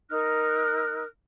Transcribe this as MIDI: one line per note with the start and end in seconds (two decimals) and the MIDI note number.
0.10 1.04 63
0.10 1.04 70
0.10 1.04 89
0.10 1.04 90